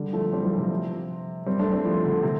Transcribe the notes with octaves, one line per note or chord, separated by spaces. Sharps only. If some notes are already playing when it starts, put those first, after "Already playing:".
Already playing: D3 G3
F3 A3
G3 C4
F3 A3
G3
C3 F3
G3 C4
A3 D4
G3 C4
F3 A3
D3
C3